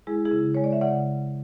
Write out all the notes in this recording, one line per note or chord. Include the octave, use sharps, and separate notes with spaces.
G#3 E4 G#4
E4 G#4
C#3
G#3 C#5
D5
E5
C#3 D5 F#5